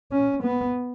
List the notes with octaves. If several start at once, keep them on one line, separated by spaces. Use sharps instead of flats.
C#4
B3